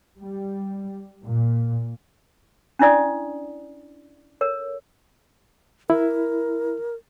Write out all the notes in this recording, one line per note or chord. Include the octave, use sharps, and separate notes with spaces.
G3
A#2
C#4 D4 E4 D5 D#6
A4 A#4 C#5
E4 A#4